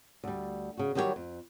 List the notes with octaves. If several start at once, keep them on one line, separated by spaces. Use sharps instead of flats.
D2 G3
C#3 F#4
D#3 F#3 G3 G4 G#4 C#5
F2